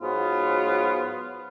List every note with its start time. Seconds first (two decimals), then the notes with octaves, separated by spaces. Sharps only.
0.01 G#2 F#3 B3 F4